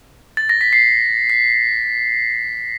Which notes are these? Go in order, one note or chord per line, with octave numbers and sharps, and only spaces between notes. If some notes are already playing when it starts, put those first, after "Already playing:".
A6
A#6
B6
C7
B6